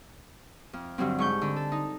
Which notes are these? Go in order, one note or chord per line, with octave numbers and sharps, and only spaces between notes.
F2
G2 D3 F#3 C4
G#2 C#6 G6
D3
A4
D#4